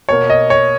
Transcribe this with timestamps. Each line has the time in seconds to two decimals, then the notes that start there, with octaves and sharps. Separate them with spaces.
0.09 B2 A#3 C#5
0.30 D#5
0.50 C#5